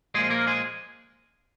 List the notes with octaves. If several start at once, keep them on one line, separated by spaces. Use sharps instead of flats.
A#2 F3 G#3 G#4
A#3 A#4
G#3 G#4